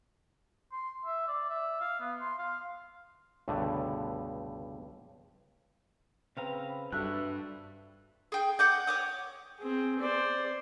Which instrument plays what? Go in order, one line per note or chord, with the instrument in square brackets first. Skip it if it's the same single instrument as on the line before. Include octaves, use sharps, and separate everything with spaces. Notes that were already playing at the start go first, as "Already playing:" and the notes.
[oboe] C6
E5
D5
E5
F5
B3
C6
F5
[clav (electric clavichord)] C#2 G2 B2 D3 A3
[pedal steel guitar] C#3 F5 A#5 [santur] C4 B4
[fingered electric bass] G2 [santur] F#4 A4 [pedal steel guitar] B4 E5 F#6
[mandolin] G#4 G5
F#5 D6 G6
C#5 D6 D#6
[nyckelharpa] C4 G#4
C5 D5